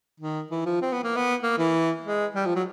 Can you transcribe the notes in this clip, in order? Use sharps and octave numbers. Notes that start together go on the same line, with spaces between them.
D#3
E3
F3
C4
B3
A#3
B3
A#3
E3
G#3
G3
F3
F#3